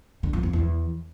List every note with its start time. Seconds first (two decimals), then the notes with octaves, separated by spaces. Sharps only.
0.23 D3
0.33 F2
0.43 F2
0.53 E2